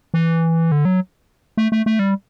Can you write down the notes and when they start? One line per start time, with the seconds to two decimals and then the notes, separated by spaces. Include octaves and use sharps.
0.14 E3
0.72 D3
0.85 F#3
1.57 A3
1.72 A3
1.86 A3
1.99 G3